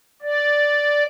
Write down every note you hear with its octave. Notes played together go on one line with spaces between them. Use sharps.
D5